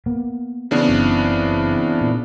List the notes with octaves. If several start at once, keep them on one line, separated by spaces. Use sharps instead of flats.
A#3 B3
C#3 E3 B3 C4 D4 E4
F#1
A#2